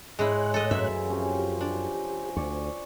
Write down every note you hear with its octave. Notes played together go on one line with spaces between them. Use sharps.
G#2 G#3 E4 C5 C#5 G#5 F#6
A2 A4 D#5
F#2 C#3 E3 E5 A#5
C3 F3 C#4 G4
D4
D2 D5 C#6